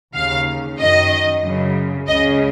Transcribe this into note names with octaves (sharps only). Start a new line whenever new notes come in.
D#2 C#3 F5
F#2 D#3 D#5
F#2 C#3
C#2 C#3 D#5